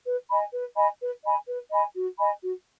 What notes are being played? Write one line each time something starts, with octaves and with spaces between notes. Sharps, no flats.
B4
D#5 G#5 B5
B4
D#5 G#5 B5
B4
D#5 G#5 B5
B4
D#5 G#5 B5
F#4
D#5 G#5 B5
F#4